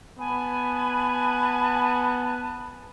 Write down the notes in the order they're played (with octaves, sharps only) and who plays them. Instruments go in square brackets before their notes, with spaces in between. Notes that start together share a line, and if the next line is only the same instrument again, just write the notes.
[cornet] B3 [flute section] G#5 A5 B5